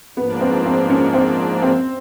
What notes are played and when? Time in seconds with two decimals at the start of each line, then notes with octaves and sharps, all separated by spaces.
0.17 G#2 F3 A#3 B3 D4
0.41 C4
0.66 C4
0.90 C#4
1.14 C4
1.62 C4